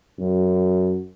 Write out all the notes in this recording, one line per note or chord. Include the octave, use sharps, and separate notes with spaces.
F#2